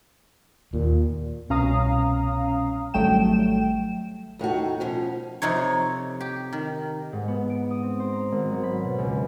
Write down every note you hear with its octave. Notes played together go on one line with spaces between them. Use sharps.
D#2 A#2
C2 B2 C#4 F5 A#5 D#6
G#1 F#3 G3 A3 G5 E7
D#2 A2 D#4 F#4
B2 F3 C#4
F2 C3 D#4 C#5
G4
D#3
G#2
B3
D7
D#6
C4
C5
A#5
G#1
F#3
B5
B2
C#2